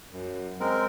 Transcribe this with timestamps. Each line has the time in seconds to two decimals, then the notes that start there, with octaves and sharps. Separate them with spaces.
0.13 F#2
0.60 G#3 C4 A#4